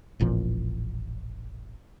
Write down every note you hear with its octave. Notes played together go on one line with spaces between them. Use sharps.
E1 A1 A#2 F3